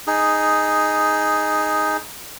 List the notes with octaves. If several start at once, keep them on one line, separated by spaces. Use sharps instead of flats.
D#4 G#4